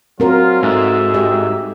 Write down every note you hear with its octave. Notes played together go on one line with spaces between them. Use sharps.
F#3 C4 F4 A#4
G#2 A3 F#4 E5
G4 D#5